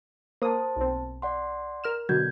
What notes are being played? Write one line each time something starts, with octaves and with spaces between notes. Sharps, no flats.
A#3 C5 A5 D#6
B1 C4
D5 F#5 C6
A#4 F6 E7
B2 D3 F#3 G6 G#6